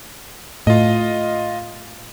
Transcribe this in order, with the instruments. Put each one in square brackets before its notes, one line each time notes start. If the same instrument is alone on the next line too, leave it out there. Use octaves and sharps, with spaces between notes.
[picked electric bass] A2 [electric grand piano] F4 D#5